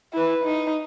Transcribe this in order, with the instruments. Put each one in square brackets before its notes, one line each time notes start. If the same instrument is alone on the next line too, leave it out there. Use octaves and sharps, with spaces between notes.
[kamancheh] E4 B4
D#4